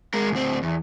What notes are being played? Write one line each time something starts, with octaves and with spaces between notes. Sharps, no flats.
G#3 A#4
D2 C4
E2